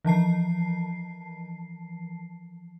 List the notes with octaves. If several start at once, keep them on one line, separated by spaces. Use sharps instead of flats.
E3 F3 A5 C7